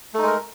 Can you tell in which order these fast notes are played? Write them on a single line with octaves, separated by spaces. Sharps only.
A3 D#4 G#3 A#4